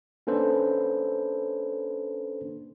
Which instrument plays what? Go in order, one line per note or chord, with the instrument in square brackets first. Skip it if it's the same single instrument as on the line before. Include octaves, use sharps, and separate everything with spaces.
[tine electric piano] A#3 C#4 D4 A4 B4 C5